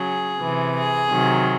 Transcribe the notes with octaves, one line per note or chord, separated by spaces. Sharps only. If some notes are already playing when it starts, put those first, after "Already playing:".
Already playing: C#3 F#3 G#4
C3 E3
G#4
C3 D#3 F#3